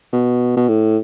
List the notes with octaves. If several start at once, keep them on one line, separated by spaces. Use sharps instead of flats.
B2
B2
A2